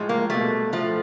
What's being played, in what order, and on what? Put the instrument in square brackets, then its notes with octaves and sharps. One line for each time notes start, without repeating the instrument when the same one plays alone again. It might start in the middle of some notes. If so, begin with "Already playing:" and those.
Already playing: [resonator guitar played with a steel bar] A2 F3 G#3
A#3
B2 G3 A3
A2 F3 A3